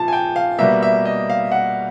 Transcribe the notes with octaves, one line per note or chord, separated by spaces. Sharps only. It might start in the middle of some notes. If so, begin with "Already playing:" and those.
Already playing: A#2 F3 A5
G#5
G5
F5
B2 G3 A#3 E5
E5
D#5
F5
F#5